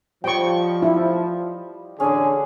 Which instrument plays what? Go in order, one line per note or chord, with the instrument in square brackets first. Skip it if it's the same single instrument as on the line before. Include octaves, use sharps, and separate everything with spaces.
[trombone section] F3 [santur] G3 D#5 [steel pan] G5 C#6
[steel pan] E4
[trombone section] A1 D3 G#4 [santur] C#4 D4 D5